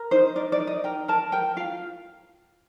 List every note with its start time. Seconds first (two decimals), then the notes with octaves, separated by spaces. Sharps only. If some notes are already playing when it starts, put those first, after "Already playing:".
Already playing: A#4
0.11 D#4 C5
0.35 A#4 D5
0.52 D5
0.60 D#4
0.67 D#5
0.84 A#4 G5
1.08 A#4 A5
1.32 A#4 G5
1.56 F4 F5